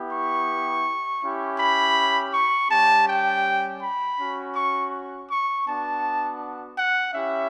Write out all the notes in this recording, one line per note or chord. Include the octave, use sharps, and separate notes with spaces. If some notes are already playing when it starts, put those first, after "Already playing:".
Already playing: B3 E4 G4
C#6
C#4 E4 G4
B5
C#6
G3 C#4 G4 A5
G5
B5
C#4 F#4
C#6
C#6
B3 D4 F#4 A5
F#5
C#4 E4 G4 E5